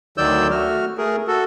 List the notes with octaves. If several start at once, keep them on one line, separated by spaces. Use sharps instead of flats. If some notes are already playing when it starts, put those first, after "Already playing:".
D2 D#3 F#3 D5 E6 G6
A3 F#4 F6
A3 G#4 A#4
F#4 A4